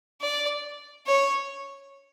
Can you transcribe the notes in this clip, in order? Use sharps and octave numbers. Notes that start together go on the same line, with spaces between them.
D5
C#5